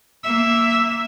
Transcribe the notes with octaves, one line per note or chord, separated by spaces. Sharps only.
A#3 E5